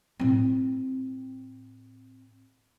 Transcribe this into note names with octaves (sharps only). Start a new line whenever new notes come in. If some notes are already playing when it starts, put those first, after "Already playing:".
A2 C4